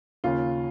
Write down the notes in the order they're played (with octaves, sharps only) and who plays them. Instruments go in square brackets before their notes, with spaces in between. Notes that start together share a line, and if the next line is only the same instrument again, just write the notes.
[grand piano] D#2 C#3 F4